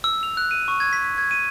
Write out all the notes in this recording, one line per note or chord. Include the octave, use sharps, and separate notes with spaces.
E6
F7
F#6
D#7
C#6
G#6
B6
B6
G#6
D#7